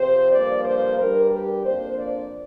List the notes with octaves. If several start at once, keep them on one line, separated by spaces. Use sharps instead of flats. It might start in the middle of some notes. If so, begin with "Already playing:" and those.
Already playing: C3 F3 C4 C5
G2 F3 A#3 D5
C5
G2 G3 D4 A#4
G4
F2 F3 A#3 D4 C5
D5